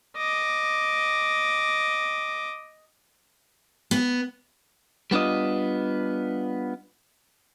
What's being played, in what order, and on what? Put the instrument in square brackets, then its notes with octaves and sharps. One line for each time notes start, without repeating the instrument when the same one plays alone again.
[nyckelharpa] D#5 D6
[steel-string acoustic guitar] B3
[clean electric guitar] G3 B3 D4 F4 D#5